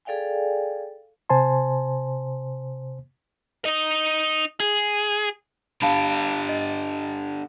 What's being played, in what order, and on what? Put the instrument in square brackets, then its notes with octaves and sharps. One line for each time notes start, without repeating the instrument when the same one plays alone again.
[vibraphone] G#4 A4 D5 F5 G5 G#5
[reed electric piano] C3 C5 G#5 A5 C6
[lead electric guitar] D#4 D#5
G#4
[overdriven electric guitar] D3 G4 [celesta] F5 A5 B5
[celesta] D#5